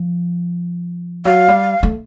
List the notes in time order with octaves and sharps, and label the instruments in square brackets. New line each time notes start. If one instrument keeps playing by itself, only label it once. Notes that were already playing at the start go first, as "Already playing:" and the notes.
Already playing: [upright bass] F3
[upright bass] F#3 [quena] F5
[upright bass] G3
A3